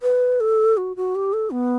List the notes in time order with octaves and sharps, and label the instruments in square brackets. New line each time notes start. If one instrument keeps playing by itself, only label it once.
[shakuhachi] B4
A4
F#4
F#4
G4
A4
B3